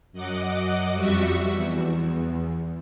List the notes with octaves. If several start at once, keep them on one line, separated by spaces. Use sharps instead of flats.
F#2 D#5 F#5 D6
F2 G3 F#4 E5 C#6
E2